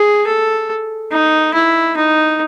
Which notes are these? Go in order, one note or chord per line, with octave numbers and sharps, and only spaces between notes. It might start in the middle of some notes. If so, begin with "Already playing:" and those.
Already playing: G#4
A4
D#4
E4
D#4